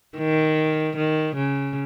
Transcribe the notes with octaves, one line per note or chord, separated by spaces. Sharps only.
D#3
D#3
C#3